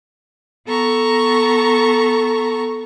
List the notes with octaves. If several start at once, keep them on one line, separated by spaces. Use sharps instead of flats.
B3 A4 A#5 C#6